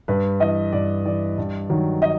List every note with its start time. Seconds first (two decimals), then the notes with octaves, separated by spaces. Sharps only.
0.08 G2 B4
0.40 E3 D#5
0.72 G2 D5
1.05 E3 D5
1.38 G2
1.70 D#3 F#3
2.02 D#5